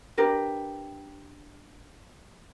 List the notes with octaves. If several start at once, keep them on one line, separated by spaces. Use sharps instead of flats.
D4 G4 A#4 B4